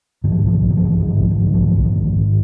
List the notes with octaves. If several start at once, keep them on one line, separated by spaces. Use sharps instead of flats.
G#2 D#3
F3
D#3
A#1 F3
D#3
A#1 F3
D#3
F3
G#2 D#3
F3
G#2 D#3
F3
D#3
A#1 F3
D#3
G#2 F3
D#3
F3
A#1 D#3
F3
A#1 D#3
F3
G#2 D#3
G#2